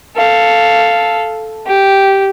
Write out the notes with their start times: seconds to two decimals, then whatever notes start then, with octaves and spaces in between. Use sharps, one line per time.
0.16 A4 F5
1.67 G4